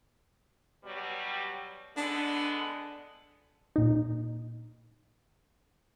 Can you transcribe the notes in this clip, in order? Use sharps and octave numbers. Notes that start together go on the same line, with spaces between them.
B2 F#3 G3
D3 G#3 B3 D4
A#2 D#4